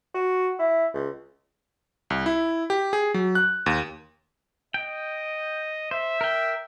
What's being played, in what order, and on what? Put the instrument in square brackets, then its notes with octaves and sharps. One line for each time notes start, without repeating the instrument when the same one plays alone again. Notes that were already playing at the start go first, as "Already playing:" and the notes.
[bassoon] F#4
E4
C#2
[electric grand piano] C2
E4
G4
G#4
F#3
F#6
D#2
[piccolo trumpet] D#5 [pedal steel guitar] G5
[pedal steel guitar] C5 [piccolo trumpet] E5
[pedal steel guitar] A#4 G5